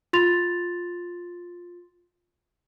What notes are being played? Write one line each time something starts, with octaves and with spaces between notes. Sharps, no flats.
F4 C6 A6 F7